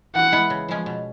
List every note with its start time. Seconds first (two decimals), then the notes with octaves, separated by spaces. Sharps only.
0.15 E3 F#5
0.32 G#3 B3 E4
0.50 C#3
0.68 F3 G#3 C#4
0.86 B2